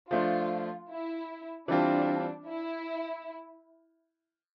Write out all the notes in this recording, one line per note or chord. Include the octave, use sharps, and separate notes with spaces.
F3 A3 D4 F4
E4
E3 G3 C4 D4 F4
E4